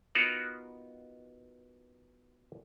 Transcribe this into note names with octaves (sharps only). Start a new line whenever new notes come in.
B3 D#4 F4 F#4 A#4 F#5